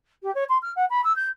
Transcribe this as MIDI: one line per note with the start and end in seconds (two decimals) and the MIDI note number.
0.23 0.33 67
0.34 0.44 73
0.49 0.58 84
0.62 0.71 89
0.76 0.85 78
0.90 1.01 83
1.04 1.15 88
1.16 1.28 91